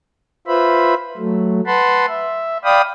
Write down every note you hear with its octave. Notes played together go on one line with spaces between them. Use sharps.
F4 B4 C5 E5 B5
F#3 A3
B4 F#5 A5 B5 C6
E5
D5 F5 G5 B5 D#6